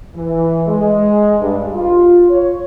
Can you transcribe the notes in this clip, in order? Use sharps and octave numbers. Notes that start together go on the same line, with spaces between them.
E3
G#3
G2
F4
C#5